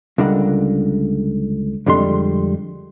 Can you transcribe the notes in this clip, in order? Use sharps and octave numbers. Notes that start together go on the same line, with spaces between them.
C#2 D3 G3 A#4 F#5
F2 D3 G3 G#3 C6